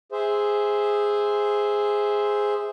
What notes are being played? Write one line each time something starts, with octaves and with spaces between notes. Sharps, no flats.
G#4 C5 E5